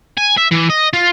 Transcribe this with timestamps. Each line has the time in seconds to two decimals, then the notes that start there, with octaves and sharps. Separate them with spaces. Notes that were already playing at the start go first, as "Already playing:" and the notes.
0.17 G#5
0.37 E5
0.51 E3
0.70 D#5
0.93 F4